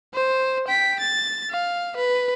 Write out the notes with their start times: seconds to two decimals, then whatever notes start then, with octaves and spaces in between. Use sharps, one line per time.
0.14 C5
0.68 G5 B6
1.00 A6
1.50 F5
1.96 B4